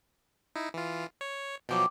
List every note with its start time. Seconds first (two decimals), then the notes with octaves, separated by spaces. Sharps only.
0.56 D#4 E4
0.74 E3 F4
1.21 C#5
1.69 B2 F3 F#3 G5 D6